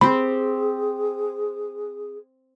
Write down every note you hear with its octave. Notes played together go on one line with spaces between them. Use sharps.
C4 G4 G#4 B5